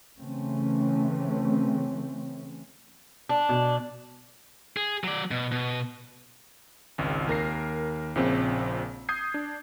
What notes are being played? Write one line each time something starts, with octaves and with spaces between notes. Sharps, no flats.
C#3 E3 A3 C4 C#4
D4
B2
G#4
F#3 D5
B2
B2
G#1 C#2
D#2 A#4 A#6 C7
A#1 A#2 C#3 C4
D#6 G6 G#6 C7
D4